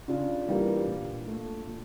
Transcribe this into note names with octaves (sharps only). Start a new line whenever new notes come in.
C#3 D4 F4
E3 G3 A#3
A#2
A3
A#2